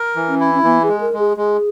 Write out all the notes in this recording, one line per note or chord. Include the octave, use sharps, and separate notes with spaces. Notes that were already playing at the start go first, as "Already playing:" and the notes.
Already playing: A#4
E3
C#4
E4
C#4
E3 B3
G#4
G#3
A#4
G#3
G#4
G#3 G#4